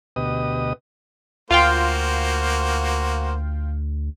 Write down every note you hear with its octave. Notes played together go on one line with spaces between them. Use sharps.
D2 B2 G4 B4 D#5 D#6
D2 A#3 F4 F#4 C5 F5 G5